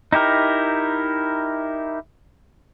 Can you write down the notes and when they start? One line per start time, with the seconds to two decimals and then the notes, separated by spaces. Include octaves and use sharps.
0.13 D#4 E4 G4 A#4